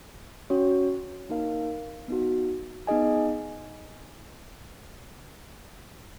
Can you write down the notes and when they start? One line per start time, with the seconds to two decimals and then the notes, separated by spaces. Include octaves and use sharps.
0.50 C#4 F#4 C#5
1.29 A#3 D#4 A#4 F5
2.08 B3 D#4 F#4
2.87 B3 D#4 G#4 D#5 G#5